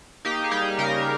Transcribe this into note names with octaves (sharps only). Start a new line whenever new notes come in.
A#3 D#4 G4
G#4
G3 D#4 G4
C#3 G4 A#4